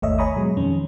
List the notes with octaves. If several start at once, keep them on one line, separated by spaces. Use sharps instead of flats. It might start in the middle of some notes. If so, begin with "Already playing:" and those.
G#1 D#2 A3 C#5 D#5 E5
C#5 G#5 A#5 B5 C#6 D#6
B2 F#3 G#3
F2 D#3 C#4